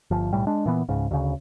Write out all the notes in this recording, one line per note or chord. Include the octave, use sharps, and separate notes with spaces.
G1 F3
B1 A2 G3
G#3 D4
A#2 E3 B3
C#2 G#2 C#3
D2 C#3